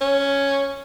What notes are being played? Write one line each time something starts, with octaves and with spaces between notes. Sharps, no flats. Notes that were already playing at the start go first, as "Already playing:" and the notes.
C#4